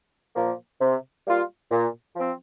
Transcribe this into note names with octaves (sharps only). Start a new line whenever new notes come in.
A#2 F3 A#3
C3
G3 A#3 F4
A#2
F3 C4